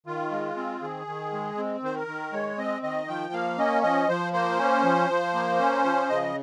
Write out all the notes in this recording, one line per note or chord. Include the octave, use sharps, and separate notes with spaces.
D#3 F4
G#3
C4
D#3 G#4
D#3
G#3
C4
D#3 C5
A#4
D#3
G#3 C#5
C4 D#5
D#3 D#5
F3 G5
A#3 F5
C#4 D#5
F3 D#5
F3 C5
A#3 C5
C#4
F3
F3
A#3
C#4
F3
C#3 D#5